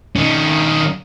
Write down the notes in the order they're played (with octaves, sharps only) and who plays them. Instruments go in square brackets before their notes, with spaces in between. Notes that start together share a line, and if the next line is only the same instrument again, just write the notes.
[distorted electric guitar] D#3 C#4